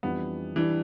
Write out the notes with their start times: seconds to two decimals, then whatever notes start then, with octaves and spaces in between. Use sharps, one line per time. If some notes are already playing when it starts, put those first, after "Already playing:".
0.03 F2 E3 G3 B3 D4
0.56 E3 G3 D4 G4 D5